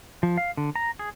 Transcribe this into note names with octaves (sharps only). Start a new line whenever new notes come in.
F3
F5
D3
A#5
G#4